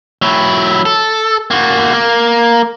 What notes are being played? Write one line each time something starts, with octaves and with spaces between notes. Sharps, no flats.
F#3 E4
A4
A#3 F#4
A#3